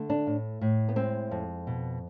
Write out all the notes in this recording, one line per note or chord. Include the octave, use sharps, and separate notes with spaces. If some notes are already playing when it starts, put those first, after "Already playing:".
Already playing: D3 A3
D4
A2
A2
B3
G#3 C4
F2
B2